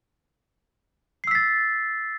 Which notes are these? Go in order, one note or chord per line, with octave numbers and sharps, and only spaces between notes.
E6 A6 B6 C7